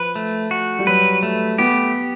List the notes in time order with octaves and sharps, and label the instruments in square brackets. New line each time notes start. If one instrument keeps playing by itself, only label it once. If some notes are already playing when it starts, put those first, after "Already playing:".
Already playing: [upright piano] F3 [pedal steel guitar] B4
[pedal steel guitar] A3
F#4
[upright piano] G3
[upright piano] F#3 [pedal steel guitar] B4
[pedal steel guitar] A3
[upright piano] B3 [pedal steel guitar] G4